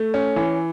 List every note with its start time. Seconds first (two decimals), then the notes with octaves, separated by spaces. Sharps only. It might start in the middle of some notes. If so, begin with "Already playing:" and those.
Already playing: A3
0.14 C#4
0.36 E3